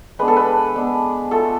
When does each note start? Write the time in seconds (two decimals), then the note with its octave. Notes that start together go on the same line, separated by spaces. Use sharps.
0.19 G#3 B3 D4 B4
0.28 A4
0.36 B4
0.76 G#3 B3 D4
1.31 A3 F4 A4